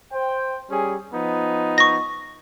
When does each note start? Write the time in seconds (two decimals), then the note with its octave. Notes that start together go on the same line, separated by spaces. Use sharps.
0.12 C5 G5
0.70 G3 C#4 G#4
1.12 F3 B3 D#4
1.78 C#6 A#6